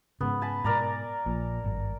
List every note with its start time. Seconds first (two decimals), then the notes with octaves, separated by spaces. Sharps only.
0.21 G#2 C#3 B3
0.41 G#5 A5 B5
0.64 G#2 B2 A#4 D5 A#5
1.26 A#1 A#2
1.64 G#1 G2